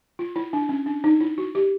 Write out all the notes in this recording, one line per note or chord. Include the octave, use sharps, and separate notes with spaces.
F4
E4
D4
C#4
D4
D#4
E4
F#4
G4